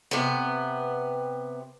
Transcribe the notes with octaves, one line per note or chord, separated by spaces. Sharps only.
C3 B3